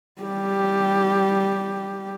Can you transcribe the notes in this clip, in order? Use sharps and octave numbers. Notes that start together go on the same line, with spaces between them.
G3 G4